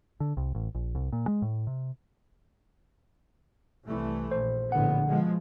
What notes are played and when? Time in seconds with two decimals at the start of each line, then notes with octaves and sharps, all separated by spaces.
0.20 D3
0.37 C2
0.55 A1
0.75 A#1
0.95 C2
1.13 A#2
1.28 G#3
1.42 A2
1.67 C3
3.84 C2 E3 A3
4.32 A#1 C5
4.72 A#1 A2 D3 B3 F#5
5.08 B2 F3 G#3